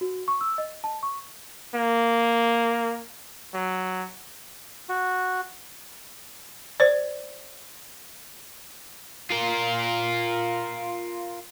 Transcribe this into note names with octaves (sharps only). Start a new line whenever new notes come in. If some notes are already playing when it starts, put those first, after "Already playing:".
F#4
C#6
E6
D#5
A5
C#6
A#3
F#3
F#4
C5 D5
F4 A#4